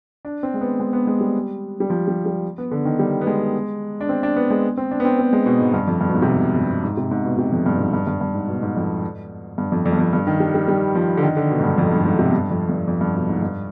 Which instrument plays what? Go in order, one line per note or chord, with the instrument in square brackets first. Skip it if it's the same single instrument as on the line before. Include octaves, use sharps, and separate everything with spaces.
[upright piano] D4
C4
G#3
B3
G#3
B3
G#3
G3
G3
F3
G3
G3
B3
D3
D#3
G3
B3
G#3
D4
C4
D4
B3
G#3
C4
D4
B3
C4
C4
G#3
B2
G#2
G2
F2
G2
B2
G#2
C3
B2
G2
G#2
C3
G#2
B2
C3
F2
G2
B2
G#2
G2
G2
G2
G#2
B2
G#2
F2
G2
F2
F2
G2
F2
G2
D#3
G3
G3
G3
F3
D3
D#3
D3
B2
G#2
G2
F2
G2
G#2
C3
G2
F2
G2
F2
G2
B2
G#2
G2